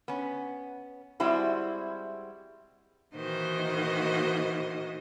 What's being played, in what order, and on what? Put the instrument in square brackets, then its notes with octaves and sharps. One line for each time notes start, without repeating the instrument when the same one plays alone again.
[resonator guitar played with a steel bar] B3 C#4
G3 G#3 C4 E4 F#4
[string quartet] A#2 D#3 E3 F#4 C5 D#5